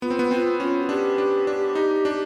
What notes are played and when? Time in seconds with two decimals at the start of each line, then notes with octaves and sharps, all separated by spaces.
0.02 B3 F4
0.10 C4
0.19 B3
0.31 C4 F4
0.60 C#4 F4
0.81 F#4
0.89 D4 G4
1.18 D4
1.47 D4
1.75 D#4
2.05 D4